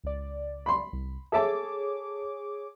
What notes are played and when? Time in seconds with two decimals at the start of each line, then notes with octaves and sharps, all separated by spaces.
0.04 C#2 D5
0.66 B5 C6
0.93 C2
1.32 G#4 A4 C#5 E5 A5 D6